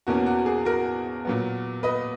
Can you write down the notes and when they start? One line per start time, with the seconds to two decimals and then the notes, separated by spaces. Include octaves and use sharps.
0.07 E2 B2 A#3 C#4 F#4
0.26 F#4
0.46 G#4
0.65 F#4 A#4
1.25 A#2 F#3 B3
1.83 B4 D#5